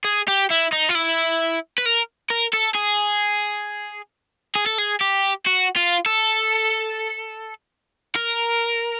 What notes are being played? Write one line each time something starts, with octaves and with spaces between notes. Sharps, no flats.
G#4
G4
E4
D#4
F4
E4
B4
A#4
A#4
A4
G#4
G#4
A4
G#4
G4
F#4
F4
A4
A#4